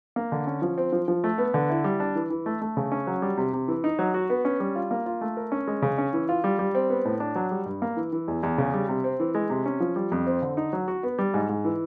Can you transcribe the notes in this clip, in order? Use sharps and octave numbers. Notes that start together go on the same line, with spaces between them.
A#3
D3
C#4
F3
C4
F3
F3
A3
B3
D3
E4
G3
D4
E3
E3
A3
A3
C#3
C#4
F#3
G3
C3
C3
E3
D#4
F#3
F#4
B3
C#4
G3
F4
A#3
F4
A3
A#4
C#4
G#3
C#3
C#4
E3
F4
G3
G3
C4
B3
A2
D4
F#3
G3
G2
A#3
E3
E3
E2
E2
C#3
G3
C3
C4
E3
G#3
C3
C#4
F3
G3
F2
C4
D3
D#4
F#3
F#4
B3
G3
G#2
G#2
E3